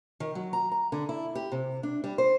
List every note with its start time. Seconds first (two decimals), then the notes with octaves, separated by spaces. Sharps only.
0.20 D#3
0.35 F#3
0.53 A#5
0.72 A#5
0.92 D3
1.09 E4
1.35 G4
1.52 C3
1.83 D4
2.04 G3
2.18 C5